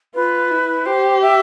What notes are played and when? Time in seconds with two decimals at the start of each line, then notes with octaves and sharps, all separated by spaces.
0.15 F4 B4
0.51 E4
0.86 G4 C5
1.21 E5